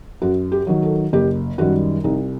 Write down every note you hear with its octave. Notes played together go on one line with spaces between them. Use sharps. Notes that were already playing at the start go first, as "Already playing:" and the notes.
F#2 F#4
G4
D#3 F#3
A4
F#1 G4
F#2 D#3 G3 F#4
C2 D#4